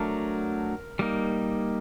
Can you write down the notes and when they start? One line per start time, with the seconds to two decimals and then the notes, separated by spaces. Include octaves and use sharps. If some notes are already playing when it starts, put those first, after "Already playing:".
Already playing: F#3 A3 D4 A#4
0.99 G3 A#3 D#4